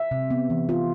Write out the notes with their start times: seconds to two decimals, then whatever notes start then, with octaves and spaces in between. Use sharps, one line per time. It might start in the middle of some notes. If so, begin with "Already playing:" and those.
Already playing: E5
0.11 C3
0.31 B3
0.50 E3
0.69 F4